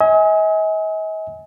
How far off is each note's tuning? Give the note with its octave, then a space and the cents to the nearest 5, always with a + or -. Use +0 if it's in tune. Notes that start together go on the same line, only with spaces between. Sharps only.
D#5 +45 G#5 +0